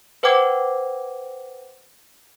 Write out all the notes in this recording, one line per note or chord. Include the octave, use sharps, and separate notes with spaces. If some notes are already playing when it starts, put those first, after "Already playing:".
B4 C5 F#5 G5 D6 G#6